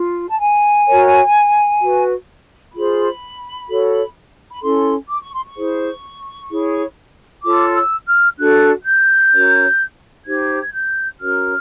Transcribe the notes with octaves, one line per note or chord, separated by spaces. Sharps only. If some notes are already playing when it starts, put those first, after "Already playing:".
Already playing: F4
A5
G#5
F#4 A#4 C#5
F#4 B4
F4 G#4 C5 B5
F#4 A4 C#5
B5
C#4 E4 A4 C6
D6
C#6
C6
C#6
E4 G#4 C5
E4 G#4 C#5
F4 A4 C#5 D6
E6
F6
D4 F#4 A4 F#6
G6
C#4 F#4 A#4 C#5
D#4 G4 C5 G#6
G#6
G6
C#4 F#4 A#4 C#5 F6